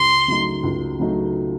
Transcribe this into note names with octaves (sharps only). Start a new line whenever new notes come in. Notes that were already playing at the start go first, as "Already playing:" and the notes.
Already playing: C#2 C6
C#3 F#3 A3 D#4
C#2
C#3 F#3 A3 D#4